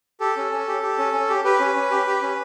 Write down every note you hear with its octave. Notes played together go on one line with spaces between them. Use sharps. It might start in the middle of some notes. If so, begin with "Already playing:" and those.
G4 A4
C#4
C#4
G4
G4
C#4
C#4
G4
G4 B4
C#4
C#4
G4
G4
C#4